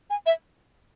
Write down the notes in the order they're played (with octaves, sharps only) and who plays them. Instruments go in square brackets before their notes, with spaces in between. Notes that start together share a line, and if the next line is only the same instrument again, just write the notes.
[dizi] G#5
E5